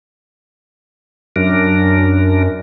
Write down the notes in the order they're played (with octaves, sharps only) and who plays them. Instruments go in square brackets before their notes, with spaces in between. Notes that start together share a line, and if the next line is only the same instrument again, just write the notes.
[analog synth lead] F#2 [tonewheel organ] D4 A#4